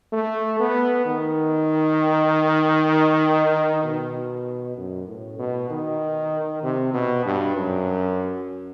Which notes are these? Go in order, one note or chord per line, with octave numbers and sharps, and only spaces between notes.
A3
B3
D#3
B2
F#2
A2
B2
D#3
C3
B2
G2
F#2